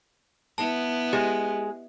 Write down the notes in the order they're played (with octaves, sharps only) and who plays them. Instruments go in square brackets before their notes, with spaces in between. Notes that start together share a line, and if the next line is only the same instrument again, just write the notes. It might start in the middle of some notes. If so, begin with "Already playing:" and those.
[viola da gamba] B3 E4 [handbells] A5
[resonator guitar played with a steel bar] G#3 [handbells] G4